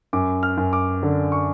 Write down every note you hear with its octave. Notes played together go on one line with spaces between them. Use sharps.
F#2 D6
F6
F#2
D6
D3
C#6